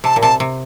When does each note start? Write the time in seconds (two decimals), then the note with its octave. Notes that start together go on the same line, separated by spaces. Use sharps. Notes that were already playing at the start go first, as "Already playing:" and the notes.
0.04 C3 A5
0.16 A#2
0.22 C3 A5
0.40 C3